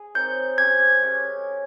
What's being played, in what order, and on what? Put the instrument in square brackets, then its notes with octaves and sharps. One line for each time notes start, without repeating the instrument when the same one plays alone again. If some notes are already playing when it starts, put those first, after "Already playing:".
Already playing: [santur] G#4
[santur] C4 D#4 A#4 C#5 [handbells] G6
[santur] C#4 G4 C5 [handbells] G#6
[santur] G#3 C#4 G4